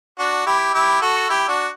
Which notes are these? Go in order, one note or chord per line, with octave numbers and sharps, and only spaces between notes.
D4 F#4
E4 G4
E4 G4
F#4 A4
E4 G4
D4 F#4